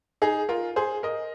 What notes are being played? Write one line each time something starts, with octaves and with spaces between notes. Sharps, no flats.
D#4 G#4
F4 A#4
G#4 C5
A#4 D#5